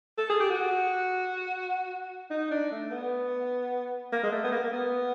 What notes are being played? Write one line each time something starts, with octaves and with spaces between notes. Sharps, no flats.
A4
G#4
G4
F#4
D#4
D4
A3
B3
A#3
G#3
A3
B3
A#3
A#3
B3